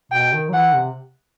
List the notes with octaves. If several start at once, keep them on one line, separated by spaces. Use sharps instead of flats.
B2 G5
D#3
F#3
E3 F#5
C3